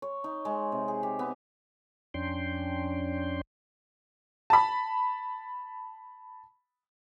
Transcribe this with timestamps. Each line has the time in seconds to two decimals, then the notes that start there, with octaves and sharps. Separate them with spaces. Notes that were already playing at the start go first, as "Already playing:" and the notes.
0.02 C#5
0.24 D#4
0.45 G#3
0.72 C3
0.88 G#4
1.03 G4
1.19 B3
2.14 F2 C#4 D4 G5 C6
4.50 A5 B5